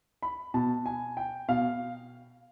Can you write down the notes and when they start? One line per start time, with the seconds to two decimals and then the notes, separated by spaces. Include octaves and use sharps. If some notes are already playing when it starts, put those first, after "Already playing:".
0.23 B5
0.54 B2 A5
0.86 G#5
1.17 G5
1.49 B2 F5